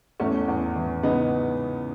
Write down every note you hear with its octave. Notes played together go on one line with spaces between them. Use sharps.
E2 A3 C#4
E2
E3
C#3 B3 D#4